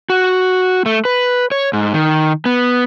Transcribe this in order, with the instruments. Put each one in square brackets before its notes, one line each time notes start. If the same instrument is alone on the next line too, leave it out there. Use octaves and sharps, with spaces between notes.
[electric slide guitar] F#4
A3
B4
C#5
G#2
D#3
B3